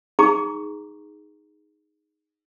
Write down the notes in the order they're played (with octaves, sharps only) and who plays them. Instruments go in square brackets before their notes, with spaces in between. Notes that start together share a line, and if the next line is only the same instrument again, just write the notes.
[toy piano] D#4 G#4 A#5 C#6 D6